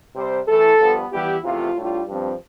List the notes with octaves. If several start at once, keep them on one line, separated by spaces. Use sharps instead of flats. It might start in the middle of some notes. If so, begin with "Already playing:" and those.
C3 G3 C4 C5
E3 A3 E4 A4
G2 F3 B3
E3 G3 B3 E4 G4
E2 C3 F3 A3 F4
A2 G3 D4 F4
G2 F3 C4